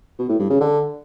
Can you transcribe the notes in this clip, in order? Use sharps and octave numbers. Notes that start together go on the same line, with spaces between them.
B2
A2
G2
C#3
D3